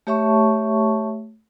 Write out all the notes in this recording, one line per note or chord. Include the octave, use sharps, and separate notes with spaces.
A3 G4 C#5 E5 A5 C#6